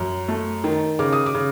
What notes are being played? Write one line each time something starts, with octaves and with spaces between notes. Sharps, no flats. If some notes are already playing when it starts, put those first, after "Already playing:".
Already playing: F#2
A3
D#3
C#3 D6
D#6
D6
C#3